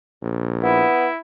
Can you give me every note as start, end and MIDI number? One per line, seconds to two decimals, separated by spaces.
0.22 0.84 34
0.63 1.07 59
0.63 1.19 64